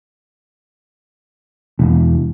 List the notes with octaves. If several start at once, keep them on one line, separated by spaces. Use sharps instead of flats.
E1